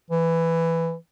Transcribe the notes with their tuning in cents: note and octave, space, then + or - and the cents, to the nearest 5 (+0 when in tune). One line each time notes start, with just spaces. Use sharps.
E3 +5